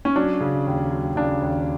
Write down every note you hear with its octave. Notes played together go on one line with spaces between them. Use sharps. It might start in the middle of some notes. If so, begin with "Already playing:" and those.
C#4
F#3 D4
C#3
D#2
F#3
C#3 D4
D#2